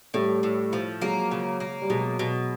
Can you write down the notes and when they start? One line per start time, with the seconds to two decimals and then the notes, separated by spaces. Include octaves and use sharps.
0.14 A2 G3 A3
0.43 A2
0.73 F3
1.02 F#3 G#3 A#3
1.31 C#3
1.60 A#3
1.82 G3
1.90 B2 F#3 G#3
2.19 B2